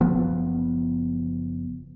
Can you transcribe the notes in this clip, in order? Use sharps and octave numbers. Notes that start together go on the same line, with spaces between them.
F#1 F3 B3